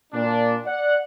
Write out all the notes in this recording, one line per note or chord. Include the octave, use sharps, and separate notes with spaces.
A#2 D4
D5 F#5